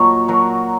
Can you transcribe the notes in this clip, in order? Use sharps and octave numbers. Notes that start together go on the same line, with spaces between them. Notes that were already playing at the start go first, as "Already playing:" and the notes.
Already playing: A#2 F#3 A#4 C#5 D#5
F#3 F#4 A#4